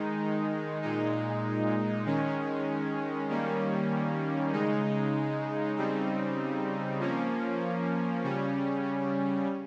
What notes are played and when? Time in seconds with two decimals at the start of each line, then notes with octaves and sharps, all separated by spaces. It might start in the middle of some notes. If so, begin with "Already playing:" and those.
Already playing: D#3 G#3 D#4
0.82 A#2 G#3 D#4
2.06 D#3 G#3 C#4
3.28 D#3 G3 A#3 C#4
4.52 C#3 G#3 D#4
5.76 C#3 G3 C4 D#4
7.00 F3 A#3 C#4
8.23 C#3 G3 C#4